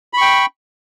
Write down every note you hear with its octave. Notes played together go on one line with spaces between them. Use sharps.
G5 B5 C#6